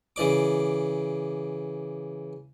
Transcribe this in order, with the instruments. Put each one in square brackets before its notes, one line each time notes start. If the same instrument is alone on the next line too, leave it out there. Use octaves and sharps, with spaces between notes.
[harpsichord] C#3 E3 D5 D6